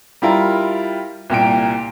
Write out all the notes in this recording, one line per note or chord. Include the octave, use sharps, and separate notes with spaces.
G3 E4 F4 A#4
C2 A#2 G5 D7